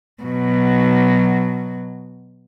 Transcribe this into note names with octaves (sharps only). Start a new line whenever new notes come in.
B2 F#3